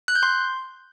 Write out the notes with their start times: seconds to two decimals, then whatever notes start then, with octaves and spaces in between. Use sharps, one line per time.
0.08 F#6
0.15 G6
0.23 C6